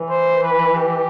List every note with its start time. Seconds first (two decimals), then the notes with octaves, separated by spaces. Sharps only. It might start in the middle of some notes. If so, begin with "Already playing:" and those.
Already playing: E3
0.09 C5
0.43 B4
0.76 G4